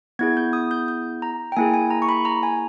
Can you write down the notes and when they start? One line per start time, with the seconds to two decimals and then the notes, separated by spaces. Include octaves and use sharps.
0.19 B3 E4 G#4 G#6
0.37 G6
0.53 D#6
0.71 G6
0.88 G6
1.22 A#5
1.52 G5
1.57 A#3 E4 G#4 G#5
1.74 G#5
1.91 A#5
2.02 C#6
2.09 B5
2.25 A#5
2.43 G#5